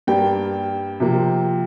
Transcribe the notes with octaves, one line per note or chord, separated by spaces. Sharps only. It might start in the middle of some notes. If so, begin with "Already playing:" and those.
G2 G3 A#3 G5
C3 F3 A#3